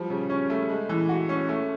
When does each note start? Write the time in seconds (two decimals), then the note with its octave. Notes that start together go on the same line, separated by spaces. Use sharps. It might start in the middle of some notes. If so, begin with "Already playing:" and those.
Already playing: F3 G3
0.10 C#3
0.30 C#4
0.50 A3
0.69 G#3
0.89 E3
1.09 F#4
1.29 C#4
1.49 A3